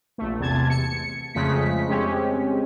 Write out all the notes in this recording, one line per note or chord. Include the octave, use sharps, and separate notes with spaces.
A#1 A3
E2 C3 A5 G#6
C#7
F2 C#3 G#3 A3 B6
G#3 C4 C#4 G4